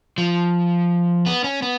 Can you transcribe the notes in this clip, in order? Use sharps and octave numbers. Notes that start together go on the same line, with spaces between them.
F3
B3
C#4
B3